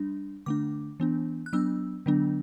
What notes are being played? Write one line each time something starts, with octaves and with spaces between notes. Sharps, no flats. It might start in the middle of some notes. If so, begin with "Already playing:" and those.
Already playing: G3 D4
D3 A3 D4 D6
E3 B3 D4
F#6
F#3 B3 D4 E6
D3 F#3 B3 D4